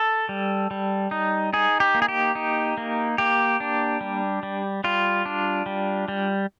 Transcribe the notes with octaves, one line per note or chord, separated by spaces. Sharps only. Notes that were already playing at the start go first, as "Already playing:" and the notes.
Already playing: A4
G3
G3
D#4
D#4 G#4
G4
A#3
G#4
G4
D#4
A#3
A#3 G4
D4
G3
G3
G3 F4
D4
G3
G3